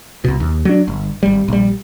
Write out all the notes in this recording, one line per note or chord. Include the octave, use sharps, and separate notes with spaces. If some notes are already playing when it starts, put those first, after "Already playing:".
C2 B2
D#2
F#3 D4
G1
G#1 G3
A#1 G3